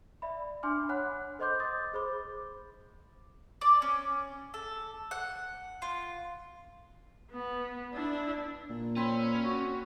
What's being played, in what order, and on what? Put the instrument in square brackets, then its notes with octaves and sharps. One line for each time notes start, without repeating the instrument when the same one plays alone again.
[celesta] D5 E5 B5
D4 G#5 C6 D6 F6
C#5 F#5 B5 F#6
A4 C5 D#5 C6 D6 G6
C6 D6 D#6 G6 A6
G#4 C5 B5 D6
[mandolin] D5
C#4
A4
F#5
F4
[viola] B3
D4 E4
[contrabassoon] A#2
[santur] C4 B5 [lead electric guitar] C#4
[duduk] F#4